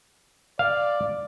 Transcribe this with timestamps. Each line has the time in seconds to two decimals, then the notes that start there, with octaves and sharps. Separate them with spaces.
0.59 D5 F5